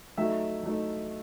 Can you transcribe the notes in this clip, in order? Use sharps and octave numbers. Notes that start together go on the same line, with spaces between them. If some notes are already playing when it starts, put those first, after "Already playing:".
F#3 A3 D#4 E5
F#3 A3 D#4